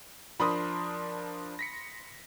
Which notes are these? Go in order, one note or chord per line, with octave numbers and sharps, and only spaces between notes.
F3 D4 A#4 B5 C6 D#6
A#6 B6 C#7